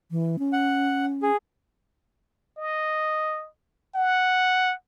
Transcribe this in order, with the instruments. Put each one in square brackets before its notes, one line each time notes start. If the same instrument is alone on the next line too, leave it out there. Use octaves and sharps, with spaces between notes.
[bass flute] E3
C#4
[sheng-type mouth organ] F#5
G#4
[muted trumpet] D#5
F#5